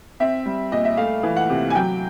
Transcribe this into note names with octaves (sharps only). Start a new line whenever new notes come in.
C4 E5
G3
A#2 D#5
E5
A3 F5
E3
F#5
C3
G#5
F#3 G5